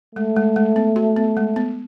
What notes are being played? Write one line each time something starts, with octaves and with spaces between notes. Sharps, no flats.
G#3 A3
G#3
G#3
B3
F#4
B3
G#3
B3